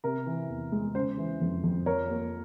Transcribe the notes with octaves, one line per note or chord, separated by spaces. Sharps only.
C3 A#4
E3
E2
G#3
C#3 C5
E3
F2
F2
F3 A#4 C#5
A#3